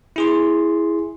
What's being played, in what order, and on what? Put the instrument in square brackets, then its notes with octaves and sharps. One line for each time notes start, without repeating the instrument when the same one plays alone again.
[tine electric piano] E4 G#4 C6